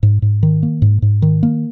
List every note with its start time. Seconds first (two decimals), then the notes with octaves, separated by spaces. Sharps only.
0.03 G#2
0.22 G#2
0.43 D#3
0.63 A#3
0.82 G#2
1.02 G#2
1.22 D#3
1.43 A#3